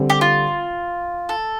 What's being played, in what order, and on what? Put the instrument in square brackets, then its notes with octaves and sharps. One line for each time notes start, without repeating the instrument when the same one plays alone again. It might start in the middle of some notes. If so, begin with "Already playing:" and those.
Already playing: [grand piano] D3 G3 C4
[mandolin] G4
F4
A4